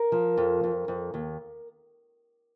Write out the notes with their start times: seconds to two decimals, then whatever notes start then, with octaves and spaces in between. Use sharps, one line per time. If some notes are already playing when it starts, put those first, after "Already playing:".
Already playing: A#4
0.12 F3
0.37 F2
0.64 F2
0.88 F2
1.14 D#2